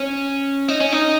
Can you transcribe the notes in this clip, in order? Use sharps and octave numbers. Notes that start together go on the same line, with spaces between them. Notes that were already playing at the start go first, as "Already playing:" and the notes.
Already playing: C#4
D#4
C#4
D#4